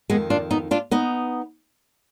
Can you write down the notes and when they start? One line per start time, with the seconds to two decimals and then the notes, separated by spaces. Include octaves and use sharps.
0.09 F2 D#3 G#3 B3
0.30 D4 F4
0.51 B3 D#4
0.71 D4 F4
0.91 B3 D#4